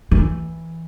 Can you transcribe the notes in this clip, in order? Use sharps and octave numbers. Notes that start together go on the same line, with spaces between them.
E3